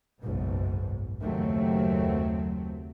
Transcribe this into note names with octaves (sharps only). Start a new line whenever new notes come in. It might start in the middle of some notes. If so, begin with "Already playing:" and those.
F#1 B1 G#2 B2
F#1 D#2 F#3 A3 C4